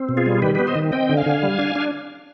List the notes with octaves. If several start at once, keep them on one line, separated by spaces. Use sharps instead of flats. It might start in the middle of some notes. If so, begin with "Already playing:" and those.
Already playing: C4
B2
F4 G#4
G3
D#3 G4 B4
B3 G4 B4
C5 D#5
D#3
C4 D#5 G5
D3
F5 G#5
D3
G3
D4
D4